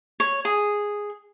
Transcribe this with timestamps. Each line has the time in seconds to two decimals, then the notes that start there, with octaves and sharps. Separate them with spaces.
0.20 C#5
0.45 G#4